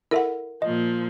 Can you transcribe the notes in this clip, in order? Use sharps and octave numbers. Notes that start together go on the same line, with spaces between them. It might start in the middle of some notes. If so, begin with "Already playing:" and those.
E4 A4 A#4 E5 F#5
A#2 F3 D#5